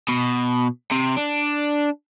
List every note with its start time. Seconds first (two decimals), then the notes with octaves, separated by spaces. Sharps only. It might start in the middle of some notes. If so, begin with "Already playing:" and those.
0.09 B2
0.91 C3
1.16 D4